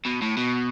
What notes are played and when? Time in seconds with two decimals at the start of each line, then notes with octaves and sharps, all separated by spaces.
0.06 B2
0.22 A2
0.37 B2